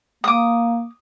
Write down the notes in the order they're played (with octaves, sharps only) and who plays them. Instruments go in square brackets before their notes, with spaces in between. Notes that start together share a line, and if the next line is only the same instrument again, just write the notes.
[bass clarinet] A#3 [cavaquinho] D6 D#6